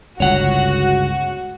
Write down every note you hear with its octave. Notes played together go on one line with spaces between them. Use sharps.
G1 C#2 F#4 C#5 F#5